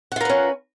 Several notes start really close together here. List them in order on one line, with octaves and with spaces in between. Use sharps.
F#5 F4 A#4 B4 C#4